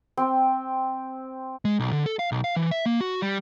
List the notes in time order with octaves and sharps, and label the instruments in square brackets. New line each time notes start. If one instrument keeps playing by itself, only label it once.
[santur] C4
[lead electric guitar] G#3
B1
D3
A4
F5
B1
F5
E3
E5
A#3
F#4
G3